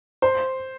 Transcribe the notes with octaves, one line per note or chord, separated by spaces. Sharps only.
C5